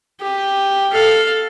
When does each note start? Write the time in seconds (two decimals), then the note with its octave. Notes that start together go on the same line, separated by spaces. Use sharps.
0.21 G4
0.92 A4 F5